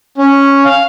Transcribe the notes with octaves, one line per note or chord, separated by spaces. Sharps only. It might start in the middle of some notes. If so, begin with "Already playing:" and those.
C#4
F5